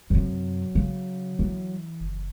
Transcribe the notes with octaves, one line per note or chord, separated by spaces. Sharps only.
F#2 C3 F#3
C#3
E3
F#1